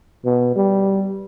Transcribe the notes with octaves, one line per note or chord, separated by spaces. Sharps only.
B2
G3